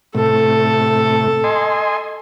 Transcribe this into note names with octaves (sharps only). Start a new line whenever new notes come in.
A2 C3 A3 A4
D#5 G#5 C6